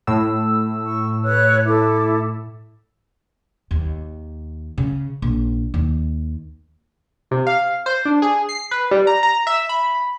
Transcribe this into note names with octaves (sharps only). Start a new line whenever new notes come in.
A2 E6
C#6
B4 C#5 F#6
E4 A4 D6
D#2
C#3
A#1
D#2
C3
F5
C5
D4
G#4
C7
B4
G3
A#5
A#5
E5
B5